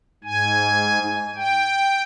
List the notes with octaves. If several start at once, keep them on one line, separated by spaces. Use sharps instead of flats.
G#2 G#5
G5